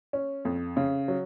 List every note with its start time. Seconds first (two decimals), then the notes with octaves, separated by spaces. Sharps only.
0.13 C#4
0.45 F2
0.77 C#3
1.08 F#3